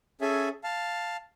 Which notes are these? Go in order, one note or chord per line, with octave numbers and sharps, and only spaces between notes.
C#4 G#4 A4 E5 G#5
F5 A5